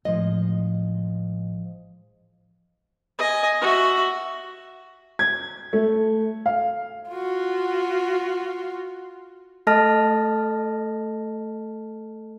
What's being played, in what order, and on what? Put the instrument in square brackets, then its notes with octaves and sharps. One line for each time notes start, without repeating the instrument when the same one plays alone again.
[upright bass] A1 [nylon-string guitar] F3 G#3 D#5
[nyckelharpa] D#5 G#5
F#4 E5
[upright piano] G#6
A3
F5
[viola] F4 F#4
[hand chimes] A3 A4 D#5 A5 F6 A#6